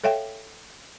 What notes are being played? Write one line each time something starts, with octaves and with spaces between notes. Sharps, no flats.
A4 C#5 E5 F5 G5